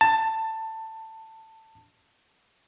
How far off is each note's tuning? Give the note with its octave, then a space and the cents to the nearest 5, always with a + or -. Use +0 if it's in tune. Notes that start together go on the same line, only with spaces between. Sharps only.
A5 +15